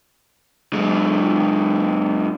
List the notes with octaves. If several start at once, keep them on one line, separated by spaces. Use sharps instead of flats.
F#2 G#3